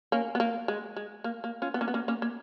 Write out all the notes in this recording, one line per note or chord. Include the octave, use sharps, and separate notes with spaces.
A#3 C#4
B3
A#3
G#3
G#3
A#3
A#3
C#4 F4
B3
A#3 C#4
B3
A#3 C#4
A#3 C#4
A#3